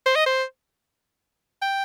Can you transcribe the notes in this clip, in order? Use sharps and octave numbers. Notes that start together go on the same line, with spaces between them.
C5
D#5
C5
G5